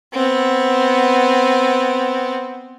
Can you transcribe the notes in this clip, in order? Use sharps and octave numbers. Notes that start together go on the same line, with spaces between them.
B3 C4